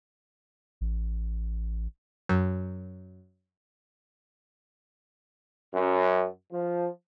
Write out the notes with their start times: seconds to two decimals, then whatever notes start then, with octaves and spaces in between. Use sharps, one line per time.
0.81 A1
2.29 F#2
5.74 F#2
6.52 F3